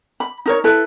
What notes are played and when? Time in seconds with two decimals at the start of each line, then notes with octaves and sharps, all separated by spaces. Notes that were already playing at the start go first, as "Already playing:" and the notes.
0.20 B5
0.46 D#4 A#4 C#5
0.64 E4 A4 B4